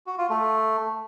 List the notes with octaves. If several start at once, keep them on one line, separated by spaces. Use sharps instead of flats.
F#4
F4
A3